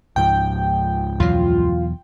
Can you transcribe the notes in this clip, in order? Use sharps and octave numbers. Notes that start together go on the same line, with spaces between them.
C#2 G#2 F3 G5
E2 B2 F#3 F4